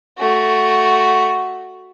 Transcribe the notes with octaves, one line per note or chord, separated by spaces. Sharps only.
A3 F#4